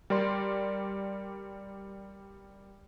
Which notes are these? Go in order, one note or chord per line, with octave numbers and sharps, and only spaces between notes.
G3 A#4 D5 C6